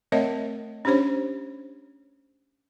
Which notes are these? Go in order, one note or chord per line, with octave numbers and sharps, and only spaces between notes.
A3 C4 A#4 C#5 D#5 E5
C#4 D4 G4 C5 C#5